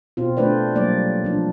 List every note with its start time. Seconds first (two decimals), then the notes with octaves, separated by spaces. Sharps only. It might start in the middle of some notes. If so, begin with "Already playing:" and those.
0.17 B2 C4 F4
0.37 A3 D4 F4 B4 C5 D5
0.75 F#3 G3 A#3 D5
1.24 F3 D4